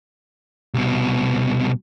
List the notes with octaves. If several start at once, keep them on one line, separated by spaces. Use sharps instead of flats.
C2 B2